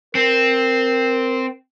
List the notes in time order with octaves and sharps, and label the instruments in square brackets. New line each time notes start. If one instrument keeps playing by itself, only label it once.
[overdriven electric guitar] C4 [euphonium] A#4